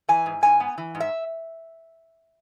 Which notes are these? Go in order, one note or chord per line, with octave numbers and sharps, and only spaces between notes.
E3 G#5
G#2
G#2 G#5
B3
E3
G#2
E5